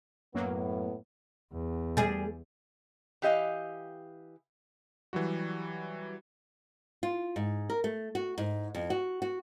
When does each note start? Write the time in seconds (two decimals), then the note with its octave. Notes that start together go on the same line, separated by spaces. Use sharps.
0.35 F#2 A2 F#3 A#3 B3
1.52 E2
1.97 G3 G#4
3.22 E3 G4 D#5 F5
5.13 E3 F#3 G3 F#4
7.03 F4
7.36 G#2
7.70 A#4
7.84 A3
8.15 F#4
8.38 G#2
8.75 F2
8.90 F#4
9.22 F#4